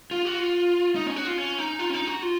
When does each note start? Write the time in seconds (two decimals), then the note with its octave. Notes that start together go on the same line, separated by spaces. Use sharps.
0.11 F4
0.25 F#4
0.39 F4
0.96 D#4
1.07 C#4
1.16 F#4
1.27 F4
1.38 C#4
1.59 D#4
1.79 F4
1.90 C#4
1.94 D#4
2.07 F#4
2.22 F4